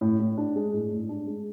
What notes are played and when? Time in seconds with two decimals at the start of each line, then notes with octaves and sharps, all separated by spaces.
0.01 A2
0.19 A2
0.37 D4
0.56 G#3
0.73 A2
0.91 A2
1.09 D4
1.27 G#3